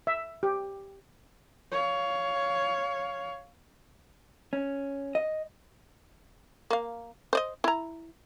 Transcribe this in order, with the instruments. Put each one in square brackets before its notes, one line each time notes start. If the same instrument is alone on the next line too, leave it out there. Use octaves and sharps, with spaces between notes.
[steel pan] E5
G4
[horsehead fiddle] C#5 F5
[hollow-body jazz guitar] C#4
D#5
[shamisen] A#3 F5
C5 D5 D#5
E4 A#5